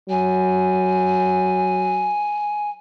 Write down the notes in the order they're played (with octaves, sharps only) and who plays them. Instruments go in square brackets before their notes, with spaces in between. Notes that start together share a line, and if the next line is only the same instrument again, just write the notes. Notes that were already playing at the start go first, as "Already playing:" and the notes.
[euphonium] F#3 [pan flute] G#5